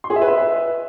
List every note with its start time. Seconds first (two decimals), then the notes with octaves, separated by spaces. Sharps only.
0.04 C6
0.10 G#4
0.16 E5
0.22 B4
0.27 E5